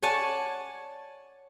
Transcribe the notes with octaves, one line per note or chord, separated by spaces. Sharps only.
C#5 D5 F#5 G#5 A5